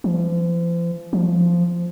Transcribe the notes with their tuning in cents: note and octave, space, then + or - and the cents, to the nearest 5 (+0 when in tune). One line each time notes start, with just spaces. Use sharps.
F3 -40
F3 -10